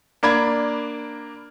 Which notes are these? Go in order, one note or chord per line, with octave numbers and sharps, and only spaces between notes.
A#3 D4 B5 G#6